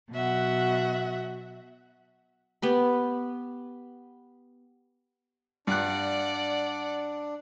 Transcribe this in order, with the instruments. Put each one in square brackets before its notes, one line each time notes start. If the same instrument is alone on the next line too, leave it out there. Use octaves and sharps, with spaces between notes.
[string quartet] B2 F#3 F#4 E5 F#5
[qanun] B3 G4 B5
[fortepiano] G2 F#6 [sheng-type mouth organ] D4 [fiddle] D5 F#5